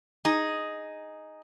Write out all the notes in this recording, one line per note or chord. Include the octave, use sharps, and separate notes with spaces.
D#4 G#4